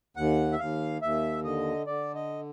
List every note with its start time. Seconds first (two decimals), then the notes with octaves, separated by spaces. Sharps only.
0.16 D#2 F#5
0.52 E5
0.59 D#2 F5
1.02 D#2 E5
1.44 D3 D#5
1.87 D3 D5
2.15 D#5